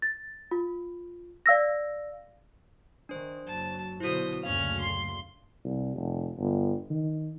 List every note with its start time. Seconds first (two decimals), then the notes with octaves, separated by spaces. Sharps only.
0.02 A6
0.51 F4
1.46 D5 F5 E6 A#6
3.09 D#3 D4 C5
3.47 F#1 F#3 A5
4.00 B2 D3 F#3 E4 F#4 C5 D#6
4.43 F#1 D2 A#2 C#4 F5 F6
4.79 C6
5.64 C2
5.95 F1
6.38 G1
6.90 D#3